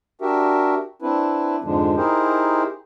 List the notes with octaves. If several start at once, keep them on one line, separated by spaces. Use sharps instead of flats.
D4 F#4 G4 A#4 E5
C4 D4 E4 B4
F2 G#2 D3 F3 G#3 D4
D#4 E4 G4 G#4 A#4 C5